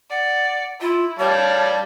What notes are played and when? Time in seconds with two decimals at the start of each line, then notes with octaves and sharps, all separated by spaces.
0.10 D5 F#5
0.81 E4 F4
1.19 G3 C#5 D5 F5 A5